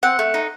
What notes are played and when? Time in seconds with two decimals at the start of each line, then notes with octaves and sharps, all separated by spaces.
0.03 C4 F#5
0.19 A3
0.34 D#4